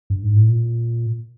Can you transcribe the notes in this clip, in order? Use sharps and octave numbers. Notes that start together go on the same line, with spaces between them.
G2
G#2
A2
A#2